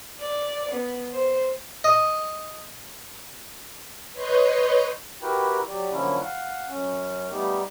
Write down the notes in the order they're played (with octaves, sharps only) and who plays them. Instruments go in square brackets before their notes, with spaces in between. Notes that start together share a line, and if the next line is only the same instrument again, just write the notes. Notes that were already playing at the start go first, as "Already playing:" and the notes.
[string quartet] D5
B3
C5
[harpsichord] D#5
[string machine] B4 C#5 D#5 C6 C#6 G6
[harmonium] E4 F#4 G4 A#4 B4 G5
F#3 G4 D5
D3 F3 F#3 A#3 C#4 E4
F5 F#5
F#2 C#4
G3 A3 B3 D#4 G4